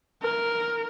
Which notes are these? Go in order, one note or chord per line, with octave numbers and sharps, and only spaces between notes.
A#4